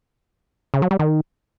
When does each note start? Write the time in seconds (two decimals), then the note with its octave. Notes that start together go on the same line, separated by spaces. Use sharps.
0.74 C#3
0.82 F#3
0.91 G3
0.99 D#3